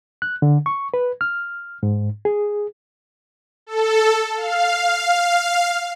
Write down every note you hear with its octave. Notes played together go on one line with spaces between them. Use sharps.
F#6
D3
C#6
B4
F6
G#2
G#4
A4
F5